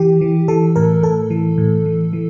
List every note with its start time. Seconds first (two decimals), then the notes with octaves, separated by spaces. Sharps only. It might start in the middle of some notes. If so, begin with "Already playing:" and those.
Already playing: E3 G4
0.21 E3
0.48 E3 A4
0.76 A2 A#4
1.03 A2 A4
1.30 E3
1.58 A2
1.86 E3
2.13 E3